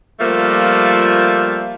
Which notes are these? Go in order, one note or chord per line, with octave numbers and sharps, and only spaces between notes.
F3 G3 A3 A#3 F4